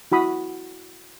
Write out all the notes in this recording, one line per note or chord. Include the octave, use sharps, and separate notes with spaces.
E4 F#4 B5 D#6